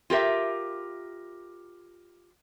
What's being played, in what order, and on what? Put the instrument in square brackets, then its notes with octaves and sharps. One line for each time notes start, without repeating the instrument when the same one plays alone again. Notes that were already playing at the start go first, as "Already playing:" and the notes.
[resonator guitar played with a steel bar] F4 G4 A#4 E5